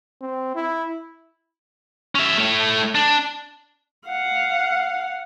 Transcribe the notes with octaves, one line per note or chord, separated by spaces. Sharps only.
C4
E4
C#4 E5
A3 C#5
D4
F5 F#5